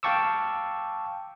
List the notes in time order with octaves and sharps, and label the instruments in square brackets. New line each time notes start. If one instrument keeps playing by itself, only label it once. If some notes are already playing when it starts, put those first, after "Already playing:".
[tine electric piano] F5 G5 A5 C#6 D6 E6